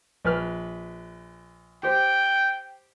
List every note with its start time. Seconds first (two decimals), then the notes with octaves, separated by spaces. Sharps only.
0.25 A#1 B4 F6
1.83 G4 C5 G5